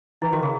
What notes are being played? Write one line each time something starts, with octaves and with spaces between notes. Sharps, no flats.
E3 E4
D#3 F#4
C#3 G#4